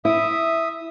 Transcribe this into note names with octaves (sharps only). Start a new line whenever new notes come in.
E4 E5 D#6